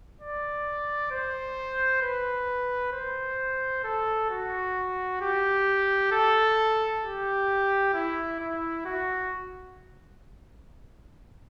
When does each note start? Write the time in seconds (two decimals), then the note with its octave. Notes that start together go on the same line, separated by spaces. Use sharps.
0.21 D5
1.11 C5
2.02 B4
2.93 C5
3.84 A4
4.30 F#4
5.21 G4
6.12 A4
7.03 G4
7.93 E4
8.40 E4
8.85 F#4